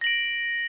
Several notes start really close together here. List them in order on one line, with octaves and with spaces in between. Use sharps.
A#6 F#7 D7